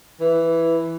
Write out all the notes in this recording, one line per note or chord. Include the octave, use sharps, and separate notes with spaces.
E3